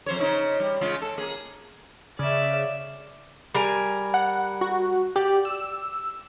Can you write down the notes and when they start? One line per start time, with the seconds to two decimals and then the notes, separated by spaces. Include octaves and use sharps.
0.06 F2 C5 C#5
0.18 C#3 D#4 C5
0.60 G3
0.81 C#3 G#3 F4
1.02 A4
1.18 A#3 G#4
2.19 C#3 D5 E5
3.55 G3 A#4 G#5
4.14 F#5
4.61 F#4
5.16 G4 D5
5.45 E6